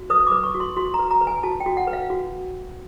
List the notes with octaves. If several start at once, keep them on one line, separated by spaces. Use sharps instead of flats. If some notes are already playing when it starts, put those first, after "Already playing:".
Already playing: F#4
B4 D#6
B4 D6
C#6
F#4
C6
F#4 C6
A#5
B4
A#5
B4
G#5
F#4 A5
G5
F#4
F#5
B4
F5
F#4